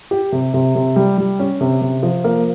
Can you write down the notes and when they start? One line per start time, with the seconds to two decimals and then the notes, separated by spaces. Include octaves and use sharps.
0.11 G4
0.32 C3
0.54 C3
0.75 C3
0.96 G3
1.18 G3
1.39 C#4
1.61 C3
1.81 C3
2.03 F3
2.24 A#3